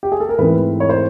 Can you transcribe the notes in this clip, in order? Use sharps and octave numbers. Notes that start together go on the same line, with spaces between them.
G4
G#4
A4
A#4
G#2 E3 A3 C4 B4
C#5
C5